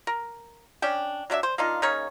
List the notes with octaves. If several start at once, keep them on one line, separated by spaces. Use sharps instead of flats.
A#4
C#4 D4 G5
F#3 A3 D4 E5
C5
A#3 D4 D#4 F4
C#3 A#3 D#4 C#5